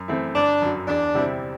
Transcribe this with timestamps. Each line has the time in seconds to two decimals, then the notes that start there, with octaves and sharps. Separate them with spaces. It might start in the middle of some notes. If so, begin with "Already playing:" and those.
Already playing: F#2
0.08 E3 A3 C4 E4
0.35 G1 D4
0.62 F#2 F#3
0.87 E2 D4
1.14 C3 G3 C4 E4